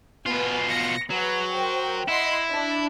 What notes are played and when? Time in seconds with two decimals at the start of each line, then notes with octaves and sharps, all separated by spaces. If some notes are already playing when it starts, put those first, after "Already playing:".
0.26 B2 B3 F4 G#5
0.68 A#6 C#7
1.10 F#3 G#4 B4 F#5
1.52 A#4 C5 G5
2.08 E4 D#5 F#5 C6
2.50 D4